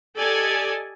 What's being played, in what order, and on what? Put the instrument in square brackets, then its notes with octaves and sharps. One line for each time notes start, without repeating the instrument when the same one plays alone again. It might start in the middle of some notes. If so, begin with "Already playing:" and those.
[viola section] G4 A4 D5 D#5 G#5